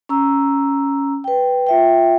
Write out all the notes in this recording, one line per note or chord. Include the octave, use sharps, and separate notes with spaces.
C#4 A#5 E6
B4 G5
F4 E5 G5